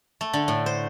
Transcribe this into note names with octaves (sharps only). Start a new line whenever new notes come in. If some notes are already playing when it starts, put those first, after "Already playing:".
A3
D3
A2
C5